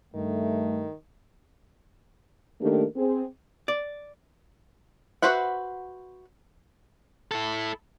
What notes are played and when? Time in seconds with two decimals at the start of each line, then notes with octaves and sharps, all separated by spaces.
0.14 G2 D#3 A3
2.62 D#3 A3 A#3 D4 G4 A#4
2.96 C4 G#4
3.68 D5
5.22 F#4 B4 C5 E5 F#5
7.31 E4 A4